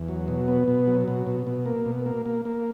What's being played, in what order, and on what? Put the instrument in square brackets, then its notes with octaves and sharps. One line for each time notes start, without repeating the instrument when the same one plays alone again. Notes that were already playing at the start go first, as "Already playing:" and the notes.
Already playing: [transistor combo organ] E2
F#3
B2
B3
B2
F#3
B2
B2
B2
A#3
B2
A#3
A#3
A#3